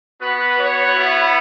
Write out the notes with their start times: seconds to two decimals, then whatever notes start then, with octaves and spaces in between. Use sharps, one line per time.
0.21 B3 F#4 B4
0.59 C#5
0.96 B3 E4